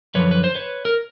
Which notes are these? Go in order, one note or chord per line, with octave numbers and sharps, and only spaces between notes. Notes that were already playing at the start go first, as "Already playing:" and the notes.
F#2 D3 F3 B4 C#5
B4
C5
B4 C#5
A#4